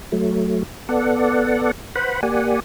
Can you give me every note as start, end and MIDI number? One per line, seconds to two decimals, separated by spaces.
0.12 0.63 54
0.12 0.63 57
0.89 1.71 59
0.89 1.71 69
0.89 1.71 74
0.89 1.71 78
1.96 2.21 71
1.96 2.21 72
1.96 2.21 78
1.96 2.21 83
2.23 2.60 58
2.23 2.60 67
2.23 2.60 74
2.23 2.60 78
2.23 2.60 80